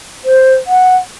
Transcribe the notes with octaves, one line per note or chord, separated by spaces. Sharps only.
C5
F#5